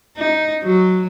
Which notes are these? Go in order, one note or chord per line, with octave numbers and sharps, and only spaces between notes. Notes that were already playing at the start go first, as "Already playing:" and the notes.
D#4
F#3